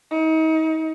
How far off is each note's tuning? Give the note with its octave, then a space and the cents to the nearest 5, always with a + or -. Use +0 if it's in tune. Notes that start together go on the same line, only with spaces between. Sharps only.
D#4 +35